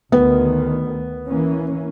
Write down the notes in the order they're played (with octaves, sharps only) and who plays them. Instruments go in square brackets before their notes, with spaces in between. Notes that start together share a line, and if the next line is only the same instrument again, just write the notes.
[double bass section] D2 D#3 [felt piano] B3
[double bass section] E3 A#3 C#4